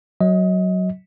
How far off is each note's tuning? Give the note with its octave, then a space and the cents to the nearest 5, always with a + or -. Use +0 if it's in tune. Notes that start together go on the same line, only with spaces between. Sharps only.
F#3 +5 D#5 +30